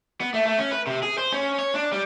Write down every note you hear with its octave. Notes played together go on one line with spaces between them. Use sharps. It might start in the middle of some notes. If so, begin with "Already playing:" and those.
B3
A3
A3
C#4
B4
C3
G#4
C5
C#4
C#5
D4
G3